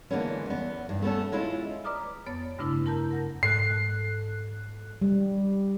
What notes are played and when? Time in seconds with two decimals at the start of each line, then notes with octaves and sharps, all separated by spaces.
0.10 D3 E3 G#3 A#3 B3 C#4
0.46 E2 B3
0.89 G2
1.02 A3 B3 C#4 A4
1.32 G#3 C#4 E4 F4
1.84 B4 D5 A#5 D6 D#6 F6
2.26 F2 B3 C#5 A6
2.59 G2 C#3 A3 D4 E4 B4
2.86 E4 A#4 A5 A#5 G6
3.11 A#4 F#5 A#6
3.43 G#2 A4 F#6 C7
5.02 G3